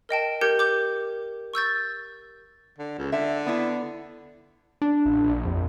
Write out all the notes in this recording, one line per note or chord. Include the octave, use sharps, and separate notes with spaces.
A#4 D#5 G5 A5
G4 A#4 G6 G#6 C#7
D6 G6
C#6 E6 G6 A6
D3
C#2
D3 E5
B3 D4 E4
D4
A1
A#1
F2